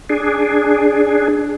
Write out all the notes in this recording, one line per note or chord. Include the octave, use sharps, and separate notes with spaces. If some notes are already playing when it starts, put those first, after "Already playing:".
D4 G#4